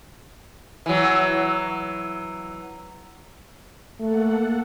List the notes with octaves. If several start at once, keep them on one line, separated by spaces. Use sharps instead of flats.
E3 F#3
A3 A#3 A4 F#5